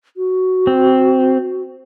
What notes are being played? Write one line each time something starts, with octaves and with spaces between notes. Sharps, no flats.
F#4
C4